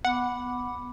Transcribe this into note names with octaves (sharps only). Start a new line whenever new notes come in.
B3 F#5 B5 D6